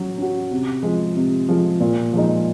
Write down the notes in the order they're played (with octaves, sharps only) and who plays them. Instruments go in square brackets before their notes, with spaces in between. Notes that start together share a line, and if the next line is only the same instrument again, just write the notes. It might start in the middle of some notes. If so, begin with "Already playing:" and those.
Already playing: [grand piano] F#3 C#4 F#4
C#4 F#4
C3
F3 G#3
C3
F3 G#3
A#2
F3 G#3 D#4